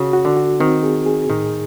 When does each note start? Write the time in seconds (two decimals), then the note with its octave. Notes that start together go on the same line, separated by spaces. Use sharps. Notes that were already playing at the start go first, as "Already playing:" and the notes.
Already playing: C#3 F#4
0.13 F#4
0.25 D3
0.37 F#4
0.60 D#3 C4
0.83 G#4
1.06 G#4
1.30 A2 D#3